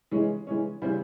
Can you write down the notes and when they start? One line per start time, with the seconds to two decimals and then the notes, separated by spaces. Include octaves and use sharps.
0.11 E3 G#3 C#4
0.47 E3 G#3 C#4
0.82 C#3 E3 G3 C4